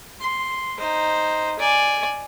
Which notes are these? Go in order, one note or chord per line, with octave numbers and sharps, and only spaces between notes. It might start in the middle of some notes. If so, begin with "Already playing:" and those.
C6
D#4 C5
D5 G#5